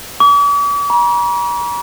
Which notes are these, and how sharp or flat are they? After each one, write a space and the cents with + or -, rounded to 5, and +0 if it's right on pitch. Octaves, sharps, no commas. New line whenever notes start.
D6 -45
A#5 +45